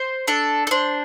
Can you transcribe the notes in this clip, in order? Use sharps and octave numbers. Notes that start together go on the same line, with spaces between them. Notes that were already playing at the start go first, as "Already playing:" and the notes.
Already playing: C5
D4 A4
A4
D4 C5